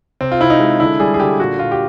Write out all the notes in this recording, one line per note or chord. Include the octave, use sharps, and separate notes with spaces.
C3 C4
F4
C3 E4
D#4
G#3
D3 E4
G3 G#4
G#4
D3 G4
A#2 F#4
A#2 F4
G4